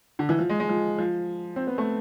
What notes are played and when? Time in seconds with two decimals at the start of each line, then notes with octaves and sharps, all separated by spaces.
0.19 D3
0.29 E3
0.39 F3
0.49 G#3
0.60 G#3
0.69 F3
0.98 F3
1.56 C4
1.67 B3
1.78 A3